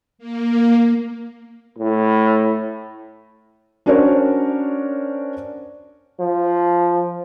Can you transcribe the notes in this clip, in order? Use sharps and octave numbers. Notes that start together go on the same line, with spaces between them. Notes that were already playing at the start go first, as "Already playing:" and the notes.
A#3
A2
C#4 D4 F#4 A#4 C5 C#5
F3